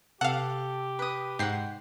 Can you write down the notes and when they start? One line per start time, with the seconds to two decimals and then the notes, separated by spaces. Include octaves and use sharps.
0.21 C3 C4 G4 A4 F5 F#5
0.99 B4 D#6
1.39 G#2 F#5 G5 C7